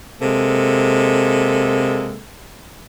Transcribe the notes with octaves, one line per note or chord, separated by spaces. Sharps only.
C3 G#3 A#3 A4